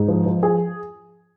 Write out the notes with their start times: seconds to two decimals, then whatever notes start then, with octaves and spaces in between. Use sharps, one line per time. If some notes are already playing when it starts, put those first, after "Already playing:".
Already playing: G#2
0.08 F3
0.26 F3
0.42 F3 G#4